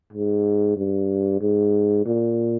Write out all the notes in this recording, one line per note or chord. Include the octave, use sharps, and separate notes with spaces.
G#2
G2
G#2
A#2